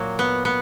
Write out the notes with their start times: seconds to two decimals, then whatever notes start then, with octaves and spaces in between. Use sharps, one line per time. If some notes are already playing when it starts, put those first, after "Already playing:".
Already playing: A#2 F#3 A#3
0.19 B3
0.45 B3